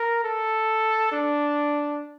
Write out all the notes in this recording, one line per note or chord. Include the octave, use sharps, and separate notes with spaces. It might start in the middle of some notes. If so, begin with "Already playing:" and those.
Already playing: A#4
A4
D4